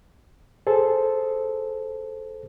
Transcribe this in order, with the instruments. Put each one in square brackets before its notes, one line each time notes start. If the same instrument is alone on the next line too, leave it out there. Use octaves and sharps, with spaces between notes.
[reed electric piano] G#4 A4 C5